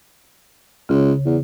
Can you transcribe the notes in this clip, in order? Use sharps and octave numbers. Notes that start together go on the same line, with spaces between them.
C#2 C#3
E2